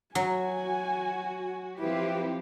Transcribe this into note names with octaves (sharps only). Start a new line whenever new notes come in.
F#3 F#4 G#5
F3 C4 E4 G4 B4